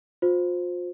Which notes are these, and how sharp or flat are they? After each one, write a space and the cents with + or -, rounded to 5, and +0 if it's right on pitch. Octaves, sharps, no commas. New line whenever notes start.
F4 +35 C5 +0